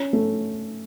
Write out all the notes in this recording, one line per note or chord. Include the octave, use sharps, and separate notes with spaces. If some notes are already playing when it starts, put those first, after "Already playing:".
Already playing: C#4
A3